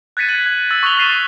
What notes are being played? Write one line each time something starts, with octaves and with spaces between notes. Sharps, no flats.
F#6 G#6 A6 B6 C#7 D#7
G#6 D#7 F#7
G#6
E6 A6 F#7
C#6 D#6 F#6 B6 F7 G7
F6 A6 B6 C7 D#7 E7